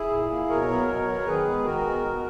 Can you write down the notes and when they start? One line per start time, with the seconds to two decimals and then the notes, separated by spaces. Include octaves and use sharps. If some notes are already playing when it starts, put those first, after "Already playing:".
Already playing: E4 G#4
0.11 A#2
0.30 A#3
0.49 B2 A#4 C#5
0.69 F#3 B3
0.88 B2
1.07 F#3 B3
1.25 D#3 G#4 B4
1.45 G#3 B3
1.64 D#3 F#4 A#4
1.84 G#3 B3
2.03 B2